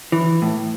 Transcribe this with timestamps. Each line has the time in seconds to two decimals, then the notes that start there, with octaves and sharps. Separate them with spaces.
0.12 E3
0.42 A2